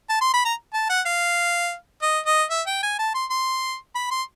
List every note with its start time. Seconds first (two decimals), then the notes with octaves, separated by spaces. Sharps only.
0.09 A5
0.21 C6
0.33 B5
0.45 A#5
0.74 A5
0.89 F#5
1.06 F5
2.02 D#5
2.26 D#5
2.51 E5
2.67 G5
2.83 G#5
2.99 A5
3.14 C6
3.30 C6
3.95 B5
4.11 C6